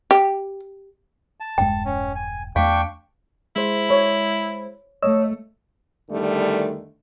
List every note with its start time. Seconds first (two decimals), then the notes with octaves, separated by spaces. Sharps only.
0.11 G4
1.40 A5
1.58 E1 G2 G#3 G5
1.85 C#4
2.16 G#5
2.56 E2 A3 D4 F5 G5 C#6
3.56 G#3 E4 C5
3.89 C#5 B5
5.02 A3 C#5 D#5 E6
6.10 E2 D3 D#3 G3 A3